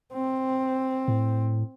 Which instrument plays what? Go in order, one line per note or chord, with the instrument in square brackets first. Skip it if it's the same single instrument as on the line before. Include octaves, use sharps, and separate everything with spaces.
[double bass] C4
[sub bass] A2